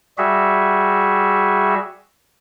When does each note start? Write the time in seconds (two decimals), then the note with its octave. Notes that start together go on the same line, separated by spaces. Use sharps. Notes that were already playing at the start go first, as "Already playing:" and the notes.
0.18 G3 F#4 G#4 E5